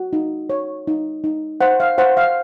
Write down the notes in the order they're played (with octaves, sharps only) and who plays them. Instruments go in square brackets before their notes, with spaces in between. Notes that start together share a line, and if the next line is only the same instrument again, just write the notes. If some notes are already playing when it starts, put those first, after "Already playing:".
Already playing: [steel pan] F#4
D#4
C#5
D#4
D#4
C5 F#5
F5
C5 F#5
F5